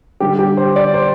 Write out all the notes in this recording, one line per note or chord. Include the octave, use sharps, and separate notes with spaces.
D3 G3 G4
G4
C5
D5
C5